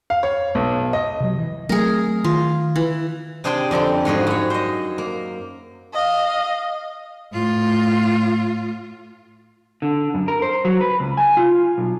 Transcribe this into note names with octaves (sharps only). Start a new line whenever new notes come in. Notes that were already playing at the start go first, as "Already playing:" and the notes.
F5
C#5
B1
D#5
C3 F#3
E3
F#3 A3 C4 G#4 A#4
D#3 F4
E3
C3 D4 G#4 C5 G5 C6
F2 D3 C4 G4
G#2 F3 F#4 G#4
F#2 C#5
C5 D#5
A#3
D#5 F5
A2 F4
D3
F#2
A#4
C5
F#3
B4
C#2
G#5
F4
B1